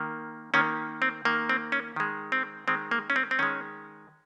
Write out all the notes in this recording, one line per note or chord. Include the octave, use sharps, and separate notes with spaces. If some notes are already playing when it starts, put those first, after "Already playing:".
Already playing: D#3 A#3
D#3 A#3 C#4
C4
D#3 A#3
C4
C#4
D#3 G#3
C4
D#3 G#3 C4
A#3
C#4
C4
C4
D#3 G#3 C#4